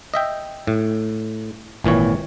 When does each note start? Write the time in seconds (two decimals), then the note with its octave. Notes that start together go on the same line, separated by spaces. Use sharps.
0.14 D#5 E5 G5
0.67 A2
1.84 G#1 A#2 E3 C#5